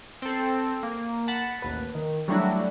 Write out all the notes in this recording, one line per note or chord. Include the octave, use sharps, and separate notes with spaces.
C4 A4
A#3
F#5 A5 B5
A1 D#2 B4
D#3
F#3 G3 A3 D4 E4 F#4